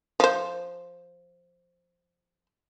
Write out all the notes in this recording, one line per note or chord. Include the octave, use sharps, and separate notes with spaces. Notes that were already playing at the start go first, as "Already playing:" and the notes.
F3 C5